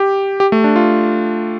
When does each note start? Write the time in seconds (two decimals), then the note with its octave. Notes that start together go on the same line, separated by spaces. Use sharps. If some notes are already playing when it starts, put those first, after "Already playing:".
Already playing: G4
0.40 G4
0.52 A3
0.64 D4
0.76 F4